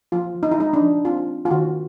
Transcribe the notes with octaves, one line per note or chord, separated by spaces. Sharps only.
F3 F4
F3
D#4
E4
G#3 D#4
D4
F3
C4 F4
C4
F4
D#3 F#4